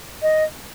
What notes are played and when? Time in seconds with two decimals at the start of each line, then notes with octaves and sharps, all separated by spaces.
0.22 D#5